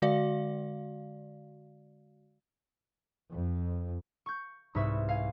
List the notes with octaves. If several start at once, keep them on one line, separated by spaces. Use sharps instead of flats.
D3 G#3 F#4 D5 F5
F2
C#6 G6
C2 G#2 B4 E5 C#6
F5 G#5